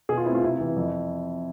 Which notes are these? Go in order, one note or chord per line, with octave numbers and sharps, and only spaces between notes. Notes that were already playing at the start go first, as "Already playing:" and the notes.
B2 G#4
F4
A3 C4 E4
F4
C3 E4
E3 B3
F2